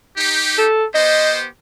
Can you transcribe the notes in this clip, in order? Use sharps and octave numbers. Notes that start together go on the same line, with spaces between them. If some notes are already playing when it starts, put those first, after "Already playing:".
D#4 G4
A4
B3 G4 C5 D#5